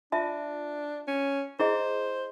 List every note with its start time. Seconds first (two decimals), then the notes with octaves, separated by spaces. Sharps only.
0.12 D4 F4 E5 A5
1.08 C#4
1.60 E4 G#4 C5 D#5